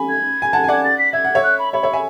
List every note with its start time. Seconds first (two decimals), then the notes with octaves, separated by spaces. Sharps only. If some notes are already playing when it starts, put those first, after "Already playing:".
Already playing: G#5 B5
0.09 G#6
0.42 G#5
0.53 F#5 A5
0.64 G#5
0.68 D5 F#5 G#6
0.84 A6
0.98 B6
1.13 E5 G#6
1.24 F#5
1.35 C#5 E5
1.43 F#6
1.59 B5
1.73 C#5 E5 B5
1.83 C#5 E5
1.93 E5 G#5